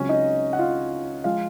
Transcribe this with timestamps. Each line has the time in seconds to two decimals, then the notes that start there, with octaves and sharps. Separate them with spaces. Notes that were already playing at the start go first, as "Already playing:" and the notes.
Already playing: C#2 C#3 F#3 C4 C#4 C#5
0.09 D#4 D#5
0.53 F#5
0.59 F4 F5
1.24 F3 G#3 F4 F5